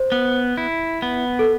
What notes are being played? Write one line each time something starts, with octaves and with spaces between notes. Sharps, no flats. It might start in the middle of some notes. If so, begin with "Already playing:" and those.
Already playing: C5
B3
E4
B3
A4